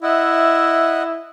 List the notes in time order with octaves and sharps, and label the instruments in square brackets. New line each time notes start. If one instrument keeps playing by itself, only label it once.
[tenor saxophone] E4 [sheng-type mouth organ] D#5 E5 F#5